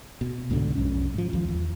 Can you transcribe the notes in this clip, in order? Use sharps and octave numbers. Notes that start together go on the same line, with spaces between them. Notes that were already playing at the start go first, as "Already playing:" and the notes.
B2
C2 G#2 B2 D3
B1 F2 C#4
G#2 F3
D#2 F3
E2